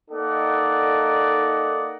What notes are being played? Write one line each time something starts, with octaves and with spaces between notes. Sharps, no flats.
A#3 D#4 A4 D5 D#5 F#5